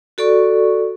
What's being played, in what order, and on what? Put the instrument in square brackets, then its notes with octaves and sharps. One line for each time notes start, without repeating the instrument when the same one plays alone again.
[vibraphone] F#4 A4 D5 C#6